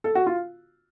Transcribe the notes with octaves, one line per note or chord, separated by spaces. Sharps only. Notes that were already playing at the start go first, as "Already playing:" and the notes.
A4
F#4
F4